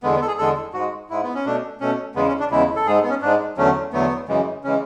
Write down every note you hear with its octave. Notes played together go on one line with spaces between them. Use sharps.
E2 D3 G#3 B3
B3
A4
G#4
E2 D3 G#3 A4
G#2 G#3 F#4
G#2 G#3 E4
B3
C#4
B2 A3 D4
B2 A3 C#4
E2 C#3 G#3 B3
C#4
D4
E2 C#3 G#3 E4
A4
G#2 G#3 G#4
B3
C#4
G#2 G#3 D4
E2 D3 F#3 A3 C#4
E2 D3 F#3 A3 B3
F#2 C#3 E3 G#3
C#3 E3 G#3 C#4